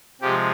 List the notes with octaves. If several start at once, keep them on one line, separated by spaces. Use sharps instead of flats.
C3 F3 G#3 G4